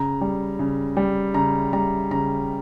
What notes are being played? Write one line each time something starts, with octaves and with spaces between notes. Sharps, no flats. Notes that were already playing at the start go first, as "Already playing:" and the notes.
Already playing: C#3 A#5
G3
C#3
G3
C#3 A#5
G3 A#5
C#3 A#5